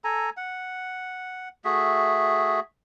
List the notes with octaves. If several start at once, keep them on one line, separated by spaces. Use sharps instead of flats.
A4 G#5 A#5
F#5
A3 F#4 G#4 E5